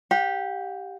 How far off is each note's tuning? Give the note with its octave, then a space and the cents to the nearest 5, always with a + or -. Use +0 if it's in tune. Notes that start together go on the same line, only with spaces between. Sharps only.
G4 +0 F#5 -45